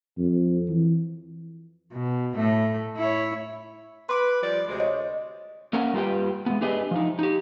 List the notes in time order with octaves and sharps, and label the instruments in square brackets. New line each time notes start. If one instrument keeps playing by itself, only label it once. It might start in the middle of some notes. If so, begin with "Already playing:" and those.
[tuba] F2
E3
[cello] B2
A2 A3
E4 C#5
[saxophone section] B4 [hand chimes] C6 D6 D7
[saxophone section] F3 G3 D5
D2 C3 G#3
[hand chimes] C#5 D#5
[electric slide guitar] A#3 C#4 A#4 F#5
G3 F4 G4 B4 G5
G#3 B3
D4 G4 G#4 B4 D#5
F3 D#4
D#4 G4